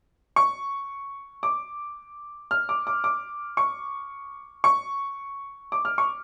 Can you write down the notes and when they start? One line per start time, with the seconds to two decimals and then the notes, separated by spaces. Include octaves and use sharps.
0.36 C#6
1.43 D6
2.51 F6
2.69 D6
2.87 D6
3.04 D6
3.57 C#6
4.64 C#6
5.72 D6
5.85 F6
5.98 C#6